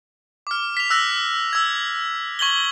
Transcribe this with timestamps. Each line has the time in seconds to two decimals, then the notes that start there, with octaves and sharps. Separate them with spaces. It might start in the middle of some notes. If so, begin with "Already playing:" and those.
0.47 D6 F6
0.77 B6 F7
0.90 E6 F#6 A#6
1.53 E6 G#6
2.39 C#6 G#6 F#7 G7